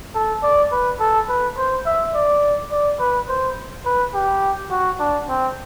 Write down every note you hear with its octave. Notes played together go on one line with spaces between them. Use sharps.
A4
D5
B4
A4
B4
C5
E5
D5
D5
B4
C5
B4
G4
F#4
D4
C4